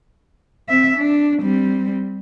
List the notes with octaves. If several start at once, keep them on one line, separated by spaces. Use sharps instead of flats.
C4 E5
D4
G3 C4